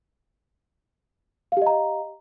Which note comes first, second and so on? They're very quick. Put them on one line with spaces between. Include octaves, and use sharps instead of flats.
F5 G4 D#5 A#5